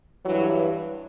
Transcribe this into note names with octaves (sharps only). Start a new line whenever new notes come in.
G2 E3 F#3